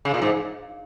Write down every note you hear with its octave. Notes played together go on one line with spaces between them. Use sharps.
C#3
A#2
G#2